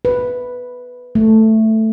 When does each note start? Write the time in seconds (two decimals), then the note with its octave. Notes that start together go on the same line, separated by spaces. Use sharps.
0.05 B4
1.15 A3